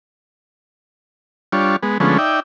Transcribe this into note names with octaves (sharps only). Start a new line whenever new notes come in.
G3 D4 F4 C#5
G#3 B3
D3 F3 G#3 A3 B3 C#4
D#4 D5 E5 G5